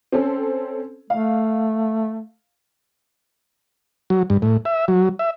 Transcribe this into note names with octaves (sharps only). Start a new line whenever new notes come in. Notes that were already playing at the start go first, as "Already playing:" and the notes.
C4 C#4 A4
A3 F5
F#3
G2
A2
E5
F#3
E5